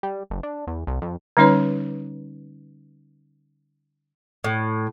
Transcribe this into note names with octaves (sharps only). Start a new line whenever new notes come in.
G3
F#1
D4
E2
C2
F2
D3 G3 C#4 D#4 B4 C#5
A2